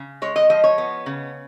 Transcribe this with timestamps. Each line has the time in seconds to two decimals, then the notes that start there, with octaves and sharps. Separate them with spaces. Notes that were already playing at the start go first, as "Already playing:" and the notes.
Already playing: C#3
0.22 G#3 C#5
0.36 D#5
0.50 F3 D#5
0.64 C#5
0.78 B3
1.06 C#3